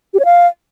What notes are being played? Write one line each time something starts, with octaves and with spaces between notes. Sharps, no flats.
G4
C#5
F5